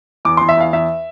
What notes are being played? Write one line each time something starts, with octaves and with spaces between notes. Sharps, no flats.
E2 D6
E2 C6
E5
E2 F5
E2 E5